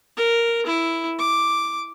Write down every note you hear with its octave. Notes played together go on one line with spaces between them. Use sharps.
A#4
E4
D6